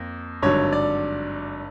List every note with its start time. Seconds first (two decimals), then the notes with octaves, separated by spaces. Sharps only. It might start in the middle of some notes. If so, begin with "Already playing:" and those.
Already playing: F2 A#3
0.42 G#1 G2 D3 F#3 C#5
0.72 D5